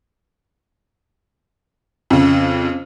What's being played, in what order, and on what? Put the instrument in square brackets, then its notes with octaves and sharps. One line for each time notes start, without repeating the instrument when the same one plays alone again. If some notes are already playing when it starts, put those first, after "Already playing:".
[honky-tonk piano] F2 C#3